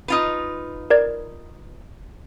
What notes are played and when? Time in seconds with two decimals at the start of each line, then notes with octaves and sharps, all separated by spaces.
0.08 D#4 F4 B4
0.90 A#4 D5 G#6